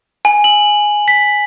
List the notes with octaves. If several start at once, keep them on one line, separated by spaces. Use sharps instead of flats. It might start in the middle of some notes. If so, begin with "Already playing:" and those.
G#5
F#7
B6